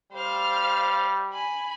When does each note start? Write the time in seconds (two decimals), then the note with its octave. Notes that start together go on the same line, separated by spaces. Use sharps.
0.13 G3 C5 F5 F6
1.32 G#5 B5